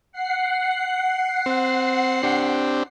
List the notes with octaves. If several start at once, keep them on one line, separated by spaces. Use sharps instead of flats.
F#5 C7
C4
C4 D4 G4